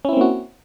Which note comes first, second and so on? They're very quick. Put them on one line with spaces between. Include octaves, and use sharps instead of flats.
C#4 E4 C4 A#3 F#4